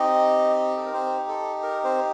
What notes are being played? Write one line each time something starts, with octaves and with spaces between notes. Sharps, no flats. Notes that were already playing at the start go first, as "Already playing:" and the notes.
Already playing: C4 D#4 G4 D#5
A4
A#4
C4 C5
A4
A#4
C4 C5